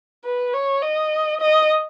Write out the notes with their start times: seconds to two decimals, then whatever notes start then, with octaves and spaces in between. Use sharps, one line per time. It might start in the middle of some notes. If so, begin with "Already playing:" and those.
0.24 B4
0.53 C#5
0.82 D#5
1.41 D#5